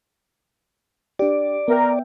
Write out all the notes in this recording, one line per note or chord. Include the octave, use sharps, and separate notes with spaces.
D4 G4 D5
B3 A#4 E5 G5